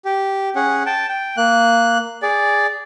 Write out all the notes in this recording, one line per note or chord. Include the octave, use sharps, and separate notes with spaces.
G4
C#4 G#4 F#5
G5 A5
G5
A#3 F#6
G#4 D5